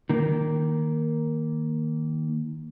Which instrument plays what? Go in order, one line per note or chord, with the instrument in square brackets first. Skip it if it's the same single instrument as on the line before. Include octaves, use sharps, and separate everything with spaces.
[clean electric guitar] D#3 A#3